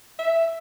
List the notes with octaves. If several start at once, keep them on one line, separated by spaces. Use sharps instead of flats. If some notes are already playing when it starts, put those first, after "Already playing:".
E5